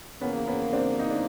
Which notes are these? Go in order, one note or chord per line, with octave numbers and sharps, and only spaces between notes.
E2 C#3 F3 A#3 B3 C#4
B3 C#4
C4 D4
D#4
D4